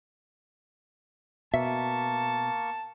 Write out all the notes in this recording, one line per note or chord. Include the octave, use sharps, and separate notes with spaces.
B2 A#3 E5 A5 C#6